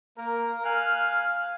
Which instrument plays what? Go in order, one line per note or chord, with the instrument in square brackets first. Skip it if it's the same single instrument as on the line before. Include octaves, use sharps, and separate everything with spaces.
[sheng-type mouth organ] A#3 [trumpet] A#4
[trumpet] F5 [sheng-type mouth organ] G#5 F6 F#6